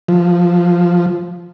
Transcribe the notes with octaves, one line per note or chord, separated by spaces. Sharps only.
F3